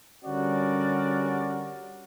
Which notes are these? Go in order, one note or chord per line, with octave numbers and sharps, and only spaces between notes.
D3 G3 C#4 F#4 A#4 D5